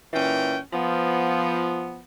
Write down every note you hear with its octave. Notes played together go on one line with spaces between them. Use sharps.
A#2 E3 C#4 G5
F3 B3